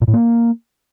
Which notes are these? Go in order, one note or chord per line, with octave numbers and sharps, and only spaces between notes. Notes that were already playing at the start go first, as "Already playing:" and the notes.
A#2
A2
A#3